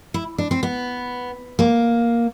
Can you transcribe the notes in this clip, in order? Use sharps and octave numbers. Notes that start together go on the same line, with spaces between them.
E4
D4
C4
B3
A#3